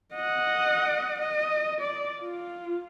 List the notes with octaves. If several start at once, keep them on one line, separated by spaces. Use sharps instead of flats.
D#5 F#5
D#5
D5
F4